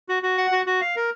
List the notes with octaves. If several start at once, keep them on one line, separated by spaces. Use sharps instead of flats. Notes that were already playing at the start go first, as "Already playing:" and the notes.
F#4
F#4
F#5
F#4
F#4
F5
A#4